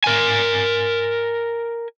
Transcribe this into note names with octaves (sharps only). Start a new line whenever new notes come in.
A#4 G#5